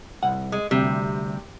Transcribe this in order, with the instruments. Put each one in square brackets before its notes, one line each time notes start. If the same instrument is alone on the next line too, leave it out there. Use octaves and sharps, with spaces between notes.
[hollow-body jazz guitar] C2 F#5
[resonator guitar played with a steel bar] G#3
[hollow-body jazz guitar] D2 G3 [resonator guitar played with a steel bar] C3